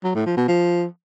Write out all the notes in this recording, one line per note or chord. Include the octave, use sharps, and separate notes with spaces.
F#3
A2
F3
B2
F3